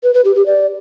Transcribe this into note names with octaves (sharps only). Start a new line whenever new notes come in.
B4
B4
G4
G4
D5